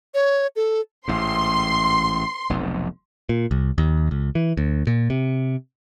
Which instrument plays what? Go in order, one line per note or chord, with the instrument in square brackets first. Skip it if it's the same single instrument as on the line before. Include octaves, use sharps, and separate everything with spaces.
[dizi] C#5
A4
[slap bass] A1 G#2 [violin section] C6
[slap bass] F1 B1 F2
[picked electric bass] A#2
C2
D#2
C#2
E3
D2
A#2
C3